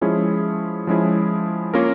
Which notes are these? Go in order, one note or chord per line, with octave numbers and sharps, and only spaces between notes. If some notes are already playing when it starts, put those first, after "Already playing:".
F3 G#3 C#4 E4 G#4
F3 G#3 C#4 E4 G#4
A#3 C#4 F4 A#4